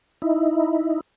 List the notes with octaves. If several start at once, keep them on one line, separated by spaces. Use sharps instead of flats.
D#4 E4